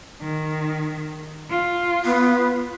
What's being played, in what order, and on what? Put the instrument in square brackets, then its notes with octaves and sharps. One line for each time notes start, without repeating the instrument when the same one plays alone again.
[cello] D#3
F4
[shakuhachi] B3